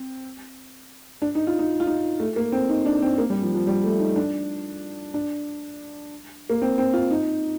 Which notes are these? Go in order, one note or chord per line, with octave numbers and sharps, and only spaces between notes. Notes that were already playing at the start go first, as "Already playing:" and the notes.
Already playing: C4
D4
D#4
F4
D#4
F4
D#4
A3
A#3
C4
D#4
D4
C4
A#3
G3
F3
F3
G3
A3
D#4
D4
D4
A#3
C4
C4
F4
D#4